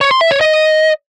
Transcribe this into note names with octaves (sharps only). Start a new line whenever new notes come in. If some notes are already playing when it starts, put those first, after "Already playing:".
C#5
C6
E5
C#5
D#5